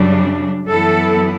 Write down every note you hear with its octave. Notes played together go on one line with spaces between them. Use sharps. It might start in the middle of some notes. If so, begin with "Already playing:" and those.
Already playing: F#2 C#3 G3 D4
F#2 E3 B3 E4 A4